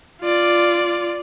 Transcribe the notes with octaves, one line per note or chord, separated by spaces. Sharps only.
F4 D5